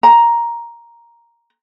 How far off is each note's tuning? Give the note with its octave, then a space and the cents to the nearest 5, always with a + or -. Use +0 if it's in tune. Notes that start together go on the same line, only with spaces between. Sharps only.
A#5 +5